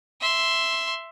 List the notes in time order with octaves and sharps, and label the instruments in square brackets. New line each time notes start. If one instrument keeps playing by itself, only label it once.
[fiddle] E5 C6